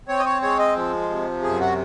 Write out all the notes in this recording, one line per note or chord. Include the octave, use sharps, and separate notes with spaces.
C4 C#5
D#5
C#5
G#3 C#5
D#5
F3
C3
F#2 G#4
F#4